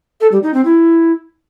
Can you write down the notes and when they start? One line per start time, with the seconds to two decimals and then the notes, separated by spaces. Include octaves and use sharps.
0.21 A4
0.32 G3
0.43 D#4
0.54 C4
0.65 E4